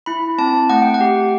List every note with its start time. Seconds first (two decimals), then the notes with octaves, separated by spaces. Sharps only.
0.06 E4 B5
0.38 C4 A5
0.69 A3 F#5
0.82 G5
0.94 F#5
1.01 G4